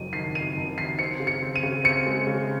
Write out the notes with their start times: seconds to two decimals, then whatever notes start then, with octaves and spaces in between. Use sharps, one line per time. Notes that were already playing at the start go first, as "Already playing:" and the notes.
Already playing: F#1 F2 F#3 D#7
0.13 D#3 C7
0.35 F#1 D#7
0.57 F#1
0.78 D#3 C7
0.99 C4 C#7
1.20 C#3
1.27 C#7
1.42 C4
1.56 D#7
1.63 C#3
1.84 C4 C#7
2.06 G#3
2.27 C#3